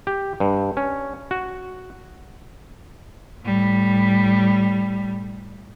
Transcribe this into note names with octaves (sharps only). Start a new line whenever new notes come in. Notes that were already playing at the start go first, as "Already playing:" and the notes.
G4
G2
C#4
F#4
A2 G3